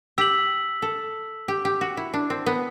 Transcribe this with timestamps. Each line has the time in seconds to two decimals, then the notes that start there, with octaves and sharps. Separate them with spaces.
0.18 G4 E6 B6 F#7
0.82 A4
1.48 G4
1.65 G4
1.81 F#4
1.97 E4
2.14 D4
2.30 C4
2.46 B3